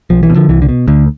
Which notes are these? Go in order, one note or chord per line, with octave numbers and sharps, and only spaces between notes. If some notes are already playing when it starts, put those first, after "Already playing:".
B1 F3
E3
B2
D3 F3
C2 E3
D3
B2
D2 D3